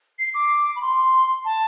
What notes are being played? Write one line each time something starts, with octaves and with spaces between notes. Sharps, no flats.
C7
D6
B5
C6
A5